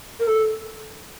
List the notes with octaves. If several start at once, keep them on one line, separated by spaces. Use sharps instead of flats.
A#4
A4